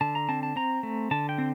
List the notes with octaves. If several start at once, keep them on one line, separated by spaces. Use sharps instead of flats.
D3 A5
A#5
C4 A5
A5
C4 A#5
A3
D3 A5
G5
C4